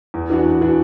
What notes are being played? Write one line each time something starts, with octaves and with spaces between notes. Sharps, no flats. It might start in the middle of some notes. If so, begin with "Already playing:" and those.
E2
E3 D4 F#4
E2
E3 D4 F#4